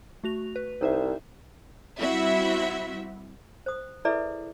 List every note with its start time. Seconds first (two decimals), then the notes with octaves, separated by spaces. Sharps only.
0.24 A3 F#4 F7
0.56 B4
0.81 C2 D#4 C5 E5
2.00 G3 C4 E4 F#4 E5
3.66 C5 D#6
4.05 E4 G#4 A4 B4 D5 E5